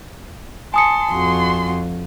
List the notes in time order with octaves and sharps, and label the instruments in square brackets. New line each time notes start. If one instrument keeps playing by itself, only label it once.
[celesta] G#5 D#6 C#7 [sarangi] A5 [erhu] C6
[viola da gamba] F2 F3 [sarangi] F#4 [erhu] C6